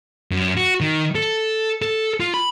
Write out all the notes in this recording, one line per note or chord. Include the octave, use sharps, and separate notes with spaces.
F#2
F#4
D#3
A4
A4
F4
B5